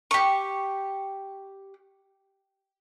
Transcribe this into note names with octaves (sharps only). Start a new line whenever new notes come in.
G4 C#6